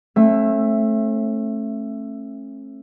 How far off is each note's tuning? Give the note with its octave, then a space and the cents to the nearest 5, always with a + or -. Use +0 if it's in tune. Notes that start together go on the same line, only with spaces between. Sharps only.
A3 +0 C#4 -40 E5 +15